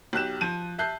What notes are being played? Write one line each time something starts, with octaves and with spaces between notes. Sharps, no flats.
B1 G4 F#6 E7
F3 D#7
E5 A5 F#6 G6 C7